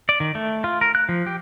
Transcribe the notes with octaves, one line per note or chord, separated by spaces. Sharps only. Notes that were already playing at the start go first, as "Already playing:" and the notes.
D5
D#3
A3
F4
A#4
F#6
F3
G4